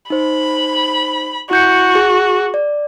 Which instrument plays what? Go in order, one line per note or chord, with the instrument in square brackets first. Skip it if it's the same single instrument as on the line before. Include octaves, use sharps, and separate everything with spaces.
[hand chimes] D#4 C5 [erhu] B5
[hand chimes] E4 G6 C#7 [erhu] F#4
[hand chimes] G#4
D5